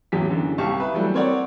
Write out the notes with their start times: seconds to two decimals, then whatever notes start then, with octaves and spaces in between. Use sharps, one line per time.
0.12 A1 E2 F#3 G4 B6
0.30 F#2 D3 E3
0.58 C2 G4 F5 A5 C#6
0.80 B4 E5
0.94 E3 F#3 G3 A3
1.14 C4 A#4 C#5 D5 F#5